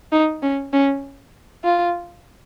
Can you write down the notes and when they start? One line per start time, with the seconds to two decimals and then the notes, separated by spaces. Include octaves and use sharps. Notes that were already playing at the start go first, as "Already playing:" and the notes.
0.12 D#4
0.42 C#4
0.73 C#4
1.64 F4